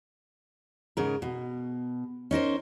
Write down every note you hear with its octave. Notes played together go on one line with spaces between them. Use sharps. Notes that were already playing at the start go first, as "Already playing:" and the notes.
G#2 C#3 A#4
B2
C#4 D#4 A#4 C5